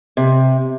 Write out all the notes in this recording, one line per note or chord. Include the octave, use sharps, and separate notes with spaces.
C3